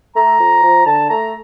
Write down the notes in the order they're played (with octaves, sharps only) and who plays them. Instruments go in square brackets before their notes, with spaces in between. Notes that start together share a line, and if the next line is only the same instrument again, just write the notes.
[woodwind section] A3 A#5
F2
F3
D3 A5
A3 A#5